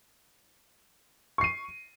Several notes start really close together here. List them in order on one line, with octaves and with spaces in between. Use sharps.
C#6 C7 D#7